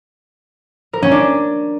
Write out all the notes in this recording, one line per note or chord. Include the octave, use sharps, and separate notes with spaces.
A#4
C#4
D4